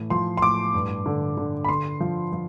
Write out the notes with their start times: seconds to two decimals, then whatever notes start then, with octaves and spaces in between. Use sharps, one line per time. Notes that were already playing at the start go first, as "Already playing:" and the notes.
Already playing: A2 E3
0.10 F3 C6
0.37 C6
0.42 A2 D6
0.74 G2
1.06 D3
1.37 D3
1.65 B5
1.69 D3 C6
2.00 F3
2.33 F3